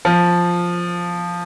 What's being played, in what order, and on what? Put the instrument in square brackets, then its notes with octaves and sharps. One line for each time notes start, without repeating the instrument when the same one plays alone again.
[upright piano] F3